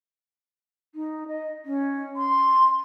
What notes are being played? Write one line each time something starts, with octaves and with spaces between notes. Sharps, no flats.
D#4
D#5
C#4
C6